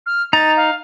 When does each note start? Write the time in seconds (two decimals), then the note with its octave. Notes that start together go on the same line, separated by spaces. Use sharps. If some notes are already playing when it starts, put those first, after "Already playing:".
0.06 F6
0.33 D#4 A#5 A6
0.56 F5